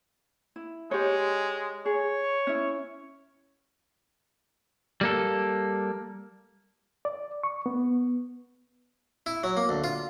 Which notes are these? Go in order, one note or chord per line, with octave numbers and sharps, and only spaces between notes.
E4
G#3 G4 C#5
G#4 C#5
C#4 E4
G3 A#3 A4
D5
C#6
B3
E4
F#3
A#3
D2
F4